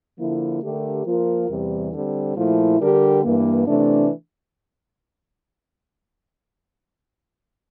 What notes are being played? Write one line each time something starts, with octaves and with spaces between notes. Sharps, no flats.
D3 F3 A#3 E4
D3 A3 D4 G4 A#4
F3 A#3 F4 A#4
E2 C3 E3 G3
D3 G3 C4
A#2 F3 A3 E4
D3 G3 D4 G4 A#4
G2 E3 A#3
C3 E3 A3 D4